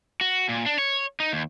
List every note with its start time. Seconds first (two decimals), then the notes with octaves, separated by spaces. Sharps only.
0.21 F#4
0.49 A#2
0.66 D4
0.78 C#5
1.20 D#4
1.33 D#2